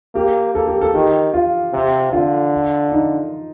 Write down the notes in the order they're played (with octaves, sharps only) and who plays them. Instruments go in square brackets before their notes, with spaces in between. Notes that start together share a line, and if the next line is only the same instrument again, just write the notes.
[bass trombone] A#3 [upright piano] G4
[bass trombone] A#3 [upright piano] A4
[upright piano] G4
A4
[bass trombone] D#3 [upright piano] G4
[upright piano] F4
[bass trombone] C3
[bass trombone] D3 [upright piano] F4
[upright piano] D#4